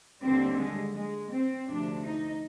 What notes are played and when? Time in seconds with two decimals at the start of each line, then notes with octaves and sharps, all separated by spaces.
0.23 D#2 D3 G3 C4
0.58 G#3
0.95 G#3
1.30 C4
1.68 D2 C3 F3 D4
2.03 D#4